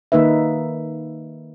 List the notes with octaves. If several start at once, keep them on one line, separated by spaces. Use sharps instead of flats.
D#3 A#3 D#4 B4 E5